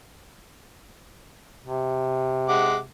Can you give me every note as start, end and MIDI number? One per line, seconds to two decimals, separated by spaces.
1.65 2.87 48
2.49 2.76 56
2.49 2.76 78
2.49 2.76 86